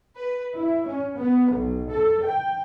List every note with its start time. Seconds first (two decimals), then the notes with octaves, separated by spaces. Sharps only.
0.17 B4
0.53 E4
0.86 C#4
1.16 B3
1.51 B1
1.91 A4
2.23 G5